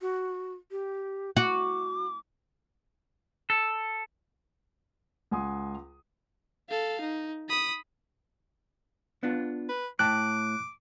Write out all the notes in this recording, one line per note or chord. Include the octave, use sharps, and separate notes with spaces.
F#4
G4
F#4 D6
A4
C#2 F#5 G#5 C6 D#6
A4 F5
D#4
B5 D#6
B3 D4 F4
B4
A2 G5 A5 D6 F#6